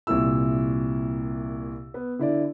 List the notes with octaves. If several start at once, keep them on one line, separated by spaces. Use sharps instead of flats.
C2 A#2 E4 E6
B3
D3 E4 D5